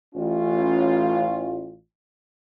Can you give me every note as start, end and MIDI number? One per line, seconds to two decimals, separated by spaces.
0.15 1.75 33
0.15 1.75 61
0.15 1.75 65